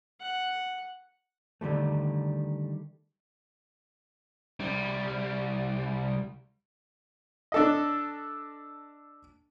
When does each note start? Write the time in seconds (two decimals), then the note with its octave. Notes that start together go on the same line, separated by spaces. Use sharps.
0.21 F#5
1.61 D3 D#3 G3 A3
4.60 C2 G3
7.52 D4 A4 D#5